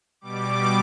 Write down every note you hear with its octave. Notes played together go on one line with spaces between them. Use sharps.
B2 G3 D6